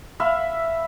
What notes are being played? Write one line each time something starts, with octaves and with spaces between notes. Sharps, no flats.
E5 F5 B5